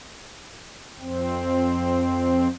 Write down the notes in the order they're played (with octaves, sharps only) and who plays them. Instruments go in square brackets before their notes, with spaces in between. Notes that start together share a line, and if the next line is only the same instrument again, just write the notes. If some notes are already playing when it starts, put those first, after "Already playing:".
[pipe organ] F2 C4